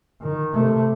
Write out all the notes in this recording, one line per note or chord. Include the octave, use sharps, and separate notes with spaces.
D#3
C3 A3